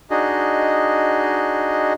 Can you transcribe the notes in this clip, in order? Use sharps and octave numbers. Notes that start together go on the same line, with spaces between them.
D4 D#4 F#4 G#4 D#5